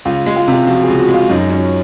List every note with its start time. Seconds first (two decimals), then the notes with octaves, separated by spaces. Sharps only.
0.05 C#2 F4
0.26 G#3
0.36 F4
0.48 C3 F4
0.67 F3 F#4
0.83 C#2 G#4
0.99 F#4
1.09 G#3
1.14 F4
1.30 F#2 D#4
1.50 C#4